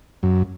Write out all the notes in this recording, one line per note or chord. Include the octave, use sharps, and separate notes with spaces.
F#2